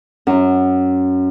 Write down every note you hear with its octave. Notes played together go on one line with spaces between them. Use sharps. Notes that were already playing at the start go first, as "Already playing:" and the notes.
F#2